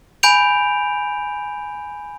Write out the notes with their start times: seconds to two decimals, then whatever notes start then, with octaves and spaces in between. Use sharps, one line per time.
0.23 G#5 B5 G6 D7 F7